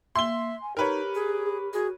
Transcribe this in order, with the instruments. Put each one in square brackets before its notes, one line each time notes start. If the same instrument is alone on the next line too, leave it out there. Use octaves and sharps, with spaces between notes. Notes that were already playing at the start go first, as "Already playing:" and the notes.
[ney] A#3 [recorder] E5 [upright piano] C6 G7
[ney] G#5
[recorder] D#4 [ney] G4 [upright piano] A#4 B4 C#5
[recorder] G#4
[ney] F#4 [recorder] G#4